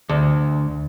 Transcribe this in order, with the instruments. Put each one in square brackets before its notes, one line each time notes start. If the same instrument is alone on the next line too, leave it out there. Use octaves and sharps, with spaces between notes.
[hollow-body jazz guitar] D2